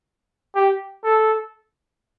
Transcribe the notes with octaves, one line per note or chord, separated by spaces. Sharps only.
G4
A4